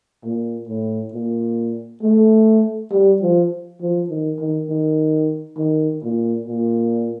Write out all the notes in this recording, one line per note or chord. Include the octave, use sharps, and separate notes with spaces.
A#2
A2
A#2
A3
G3
F3
F3
D#3
D#3
D#3
D#3
A#2
A#2